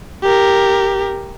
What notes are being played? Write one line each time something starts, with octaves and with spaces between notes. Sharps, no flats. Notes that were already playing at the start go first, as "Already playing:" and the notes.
G4 A#4